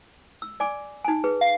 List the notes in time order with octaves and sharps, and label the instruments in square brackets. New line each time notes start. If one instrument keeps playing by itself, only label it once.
[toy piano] E6
D5 G#5 D6
D#4 G#5
G#4 B4
[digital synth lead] F5